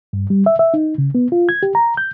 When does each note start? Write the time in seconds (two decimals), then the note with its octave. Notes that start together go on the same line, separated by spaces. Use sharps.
0.13 G2
0.30 G3
0.46 E5
0.59 E5
0.74 D#4
0.98 C#3
1.15 B3
1.32 F4
1.49 G#6
1.63 G4
1.75 A#5
1.97 G6